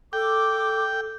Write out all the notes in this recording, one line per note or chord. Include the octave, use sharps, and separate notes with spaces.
A4 G5 D6